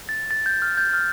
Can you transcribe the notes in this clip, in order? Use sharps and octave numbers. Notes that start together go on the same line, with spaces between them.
A6
A6
G6
F6
G6
F6